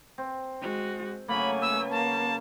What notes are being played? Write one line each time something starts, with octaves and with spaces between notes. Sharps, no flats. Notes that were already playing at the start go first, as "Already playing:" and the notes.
C4
G#3 F#4
C#3 F#3 A3 A#3 G#5 B5
B4 E6
A#3 A5